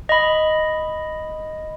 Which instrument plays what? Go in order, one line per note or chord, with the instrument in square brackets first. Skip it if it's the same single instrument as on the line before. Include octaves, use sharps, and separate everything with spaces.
[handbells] D#5 B5